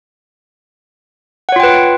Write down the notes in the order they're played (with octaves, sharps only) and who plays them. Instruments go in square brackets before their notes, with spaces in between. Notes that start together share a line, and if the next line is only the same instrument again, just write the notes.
[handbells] F#5
C#5
F4
G5
B4